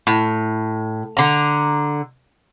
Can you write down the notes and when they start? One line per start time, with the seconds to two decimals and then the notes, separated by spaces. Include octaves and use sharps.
0.07 A2
1.17 D3 A#5